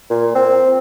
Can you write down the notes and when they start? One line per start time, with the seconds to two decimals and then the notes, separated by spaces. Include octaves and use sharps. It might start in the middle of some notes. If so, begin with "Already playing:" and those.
0.10 A#2
0.35 C4